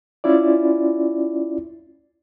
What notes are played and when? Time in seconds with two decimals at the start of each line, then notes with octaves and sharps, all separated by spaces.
0.24 C#4 E4 F4 D5